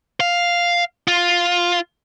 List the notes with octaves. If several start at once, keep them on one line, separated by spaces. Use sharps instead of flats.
F5
F4